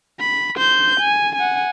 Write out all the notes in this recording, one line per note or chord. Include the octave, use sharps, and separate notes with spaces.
B5
C5 G6
G#5
F#5 G#5